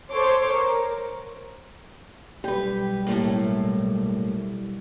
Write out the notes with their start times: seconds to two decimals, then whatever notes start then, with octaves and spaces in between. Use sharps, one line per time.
0.12 A4 C5 C#5 C6 D6
0.52 A#4
2.44 B1 G3 G4 B4
3.07 A2 A3 A#3